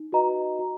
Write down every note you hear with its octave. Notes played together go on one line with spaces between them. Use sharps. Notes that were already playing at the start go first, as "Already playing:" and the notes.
Already playing: D#4
F#4 B4 D#5 A#5
F#4